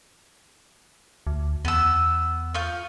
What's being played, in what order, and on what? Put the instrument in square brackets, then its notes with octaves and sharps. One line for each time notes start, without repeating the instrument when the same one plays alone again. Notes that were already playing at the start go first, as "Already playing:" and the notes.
[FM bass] D2
[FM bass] E2 [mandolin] B3 E6
[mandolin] F4 C#6 G6